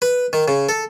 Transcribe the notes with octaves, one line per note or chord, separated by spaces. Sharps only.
B4
D#3
C#3
A4